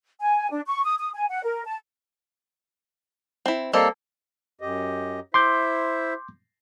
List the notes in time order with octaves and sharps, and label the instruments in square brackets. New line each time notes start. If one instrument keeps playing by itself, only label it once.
[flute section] G#5
D4
C#6
D#6
D#6
G#5
F#5
A#4
A5
[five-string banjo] C4 E4
[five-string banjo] G3 C4 D#5 [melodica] A#3 A4
[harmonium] F#2 G4 D#5
[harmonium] E4 C5 E5 [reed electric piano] C6 D6 G6